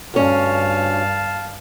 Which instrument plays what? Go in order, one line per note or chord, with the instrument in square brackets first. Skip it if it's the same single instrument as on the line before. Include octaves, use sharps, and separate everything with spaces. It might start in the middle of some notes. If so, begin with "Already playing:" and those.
[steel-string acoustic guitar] D2 C#4 [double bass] G2 [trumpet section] F5 A5